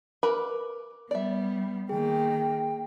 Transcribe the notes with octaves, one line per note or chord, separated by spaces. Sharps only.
A#4 B4 B5 D6
G3 B3 D5 E5
D#3 A#3 G#4 G5